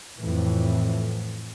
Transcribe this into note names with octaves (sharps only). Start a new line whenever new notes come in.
F2 A2 E3